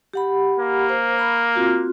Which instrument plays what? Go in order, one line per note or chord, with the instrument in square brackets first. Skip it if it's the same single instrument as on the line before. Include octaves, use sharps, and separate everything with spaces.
[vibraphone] G4 F#5 B5
[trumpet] A#3
[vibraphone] C5
B5
C4 F4 F#4